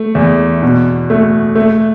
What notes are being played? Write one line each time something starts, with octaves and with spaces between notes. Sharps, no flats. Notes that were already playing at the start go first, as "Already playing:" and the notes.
Already playing: A3
E2
B2
A3
A3